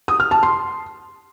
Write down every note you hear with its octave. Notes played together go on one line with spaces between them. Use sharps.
D#6
F6
A5
C6